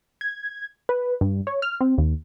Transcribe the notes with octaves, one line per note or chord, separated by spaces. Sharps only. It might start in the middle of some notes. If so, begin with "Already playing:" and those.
G#6
B4
G2
C#5
F6
C4
D#2